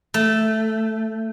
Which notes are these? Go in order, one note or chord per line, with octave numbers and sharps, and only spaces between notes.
A3